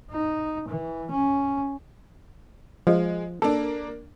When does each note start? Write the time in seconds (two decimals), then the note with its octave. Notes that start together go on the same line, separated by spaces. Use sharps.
0.11 D#4
0.69 E3
1.11 C#4
2.87 F3 G#3
3.42 A#3 D4 A4